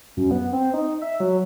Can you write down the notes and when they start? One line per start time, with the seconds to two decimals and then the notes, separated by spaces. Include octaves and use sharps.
0.17 F#2
0.31 B3
0.53 C4
0.74 D#4
1.02 E5
1.20 F#3